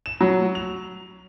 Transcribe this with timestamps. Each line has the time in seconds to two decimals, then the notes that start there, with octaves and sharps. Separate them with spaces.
0.06 E7
0.21 F#3
0.55 F7